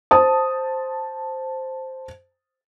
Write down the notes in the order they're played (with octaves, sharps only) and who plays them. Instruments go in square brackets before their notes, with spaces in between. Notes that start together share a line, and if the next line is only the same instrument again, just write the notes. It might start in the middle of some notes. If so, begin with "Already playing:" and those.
[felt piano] C5 A5 D#6